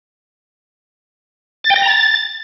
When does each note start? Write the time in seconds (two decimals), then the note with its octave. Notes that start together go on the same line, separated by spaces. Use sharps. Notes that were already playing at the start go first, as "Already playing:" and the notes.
1.64 A6
1.70 G5
1.76 A#6
1.82 A#5
1.88 A6